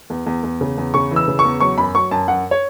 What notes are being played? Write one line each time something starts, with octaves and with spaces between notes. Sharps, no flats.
E2
E2
E2
C#3
E2
C#3 C#6
E3
E6
C#3
C#6
E2
F#3 C#6
F#2 B5
F#3 C#6
F#2 A5
F#2 F#5
C#5